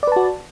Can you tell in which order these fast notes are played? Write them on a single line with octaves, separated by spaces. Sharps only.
D5 B4 A5 F#4